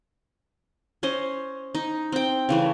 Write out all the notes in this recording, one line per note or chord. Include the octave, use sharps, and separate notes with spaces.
C#4 C5 D#5
D#4
C4 G5
C#3 E3 A3